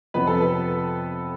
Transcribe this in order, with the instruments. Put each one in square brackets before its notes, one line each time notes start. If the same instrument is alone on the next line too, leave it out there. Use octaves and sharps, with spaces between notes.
[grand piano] F2 C3 F3 B3 B4
A4
B4